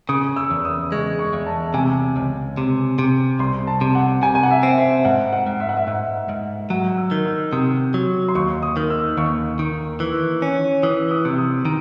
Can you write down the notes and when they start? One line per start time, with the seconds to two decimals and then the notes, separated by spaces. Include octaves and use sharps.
0.09 C#3 D#6
0.36 E6
0.51 E2
0.65 D#6
0.92 G#3 C#6
1.19 C#6
1.33 E2
1.47 A5
1.74 C3 G#5
2.16 C#2
2.57 C3
2.99 C3
3.39 C2 C6
3.67 A5
3.81 C3
3.95 F#5
4.22 C3 G#5
4.35 G#5
4.43 F#5
4.51 E5
4.63 C4
4.78 E5
5.05 G#2 F#5
5.33 F#5
5.47 G#2
5.60 E5
5.69 F#5
5.77 E5
5.87 G#2 F#5
6.29 G#2
6.70 F#3 F#5
6.97 E6
7.11 D#3
7.26 E6
7.52 C3 D#6
7.94 F#3
8.29 C6
8.35 D#2 C#6
8.62 D#6
8.77 D#3
8.90 E6
9.17 D#2 C#6
9.59 D#3
10.00 E3
10.42 C#4
10.83 E3 D#6
11.11 D#6
11.25 C3
11.34 E6
11.38 D#6
11.65 D#3